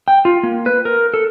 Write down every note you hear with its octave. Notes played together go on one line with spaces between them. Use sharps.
G5
F4
A#3
B4
A#4
A4